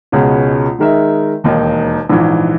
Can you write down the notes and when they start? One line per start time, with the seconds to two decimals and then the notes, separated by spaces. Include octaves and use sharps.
0.12 C#2 B2 G#3 C#4
0.79 D#3 G#3 D#4 A#4 E5
1.44 E1 D#2 D#3 A#3 D#4
2.09 A#1 G#2 E3